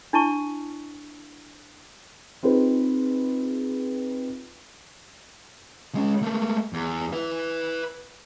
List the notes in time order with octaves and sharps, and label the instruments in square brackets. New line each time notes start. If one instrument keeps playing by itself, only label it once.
[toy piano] D4 E4 A5 C#6
[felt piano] C4 D#4 F4 G#4 B4
[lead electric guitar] G#3 C#4
A3 A#3
E2
B4 E5